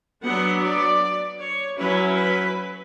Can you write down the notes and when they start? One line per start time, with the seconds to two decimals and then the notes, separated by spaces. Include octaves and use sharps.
0.22 F#3 B3 D4 F#5
0.61 D5
1.39 C#5
1.78 F#3 C#4 E4 B4
2.18 B4